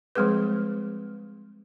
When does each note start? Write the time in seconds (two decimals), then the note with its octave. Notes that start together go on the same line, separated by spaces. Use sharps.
0.15 F3 G3 G#3 C4 G#4 B4